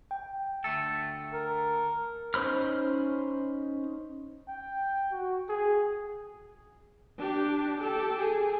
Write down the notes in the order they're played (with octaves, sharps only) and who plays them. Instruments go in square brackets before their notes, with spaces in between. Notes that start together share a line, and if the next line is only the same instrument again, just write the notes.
[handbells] G5
[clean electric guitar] D2 A3 A4
[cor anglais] A#4
[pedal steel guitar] C#4 D#4 C5 B5 F6
[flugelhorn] G5
F#4
G#4
[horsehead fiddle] D4 G4
G4 A4
G#4